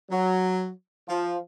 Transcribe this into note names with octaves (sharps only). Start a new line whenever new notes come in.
F#3
F3